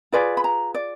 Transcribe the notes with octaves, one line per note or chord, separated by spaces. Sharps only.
F4 G#4 B4 D5
B5
A#5
D5